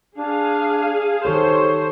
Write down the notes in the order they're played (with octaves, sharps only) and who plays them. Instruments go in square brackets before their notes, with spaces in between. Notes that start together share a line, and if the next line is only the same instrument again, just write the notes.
[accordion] D4 [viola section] G#4 F5
[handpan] D#3 G4 A4 [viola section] C5 [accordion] C#5